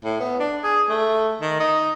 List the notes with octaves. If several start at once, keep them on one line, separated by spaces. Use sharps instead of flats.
A2
B3
D4
G#4
A3
D#3
D#4